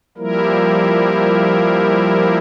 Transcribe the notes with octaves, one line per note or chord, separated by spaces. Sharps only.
F3 G3 A#3 E4 A#4